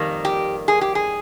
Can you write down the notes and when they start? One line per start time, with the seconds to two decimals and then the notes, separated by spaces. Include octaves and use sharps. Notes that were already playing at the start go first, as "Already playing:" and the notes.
Already playing: F2 D#3 G3 A#3
0.25 G4
0.68 G#4
0.81 G4
0.95 G#4